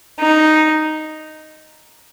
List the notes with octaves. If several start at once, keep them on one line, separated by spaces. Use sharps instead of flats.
D#4